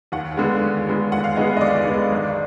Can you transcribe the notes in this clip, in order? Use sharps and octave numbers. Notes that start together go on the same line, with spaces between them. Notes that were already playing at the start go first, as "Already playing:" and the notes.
D#2 F#5
D3 G#3 B3
D#2
D3 G#3 B3
D#2 F#5
F5
D3 G#3 B3 D#5
B4
D#5
D#2 D5
D3 G#3 B3
G#1